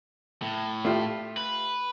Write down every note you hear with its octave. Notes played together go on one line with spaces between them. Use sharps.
A2
A3 F4 G4
B4